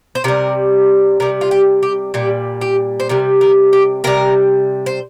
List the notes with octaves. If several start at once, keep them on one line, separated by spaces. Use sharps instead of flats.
C5
C3 G3 A#4
C3 G3 A#4
F4
G4
G4
A#2 G3 G4
G4
C5
C3 G3 A#4
A#4
G4
C3 G3 A#4
C5